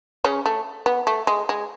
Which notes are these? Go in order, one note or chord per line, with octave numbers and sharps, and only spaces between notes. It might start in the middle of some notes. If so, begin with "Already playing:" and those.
C#3 C#4
A3
B3
A3
G#3
G#3